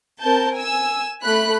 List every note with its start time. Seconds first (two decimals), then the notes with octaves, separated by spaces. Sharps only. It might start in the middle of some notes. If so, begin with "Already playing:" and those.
0.22 C4 A#4 A5 G6
0.54 G#5 E6
1.22 A3 B5 F#6